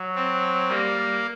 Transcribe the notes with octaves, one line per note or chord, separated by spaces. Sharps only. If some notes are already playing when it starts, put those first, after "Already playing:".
Already playing: F#3
C4
G3 A#3
G3